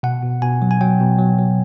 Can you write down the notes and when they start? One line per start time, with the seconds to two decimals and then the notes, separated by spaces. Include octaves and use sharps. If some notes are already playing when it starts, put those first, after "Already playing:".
0.03 B2 F#5
0.23 B2
0.42 B2 G#5
0.62 F#3
0.71 G#5
0.80 F#3 G5
1.00 B2
1.19 F#3
1.38 F#3